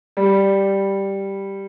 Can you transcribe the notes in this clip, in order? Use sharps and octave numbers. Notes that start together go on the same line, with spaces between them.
G3